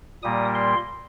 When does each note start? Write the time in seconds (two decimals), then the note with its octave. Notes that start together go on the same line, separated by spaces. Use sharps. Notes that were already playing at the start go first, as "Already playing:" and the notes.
0.22 A#2 G3 A#3 D#6
0.55 C6